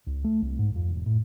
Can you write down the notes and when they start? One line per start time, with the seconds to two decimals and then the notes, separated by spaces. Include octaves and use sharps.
0.07 C#2
0.24 A3
0.42 C2
0.59 G#2
0.76 F2
0.90 E1
1.06 A2